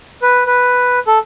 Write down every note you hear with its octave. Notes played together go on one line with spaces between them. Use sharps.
B4
B4
A4